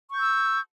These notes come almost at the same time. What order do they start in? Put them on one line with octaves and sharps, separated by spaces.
C#6 G6 E6